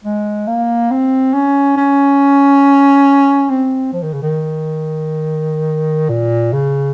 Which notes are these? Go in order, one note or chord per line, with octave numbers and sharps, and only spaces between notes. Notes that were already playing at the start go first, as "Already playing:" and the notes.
G#3
A#3
C4
C#4
C#4
C4
F3
D#3
C#3
D#3
A#2
C#3